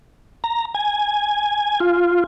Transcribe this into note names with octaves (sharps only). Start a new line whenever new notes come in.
A#5
G#5
F4